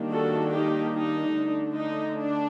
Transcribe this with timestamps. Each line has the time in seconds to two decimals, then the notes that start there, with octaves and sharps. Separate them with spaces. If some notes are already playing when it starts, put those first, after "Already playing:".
Already playing: D#3 G3 A#3 D4
0.12 F#4 A4
0.53 D#4 G4
0.94 D#4
1.34 D3 A3 D4
1.75 D#4
2.16 D4